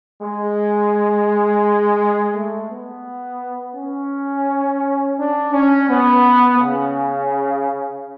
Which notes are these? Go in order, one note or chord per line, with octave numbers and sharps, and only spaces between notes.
G#3
A3
B3
C#4
D4
C#4
B3
C#3